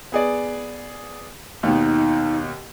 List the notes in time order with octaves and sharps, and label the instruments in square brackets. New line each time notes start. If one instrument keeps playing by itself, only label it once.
[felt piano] B3 G#4 D5
[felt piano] D#2 B2 [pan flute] D#4